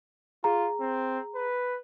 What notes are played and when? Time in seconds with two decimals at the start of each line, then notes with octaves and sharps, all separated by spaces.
0.44 F4 G#4 A#5
0.80 C4
1.35 B4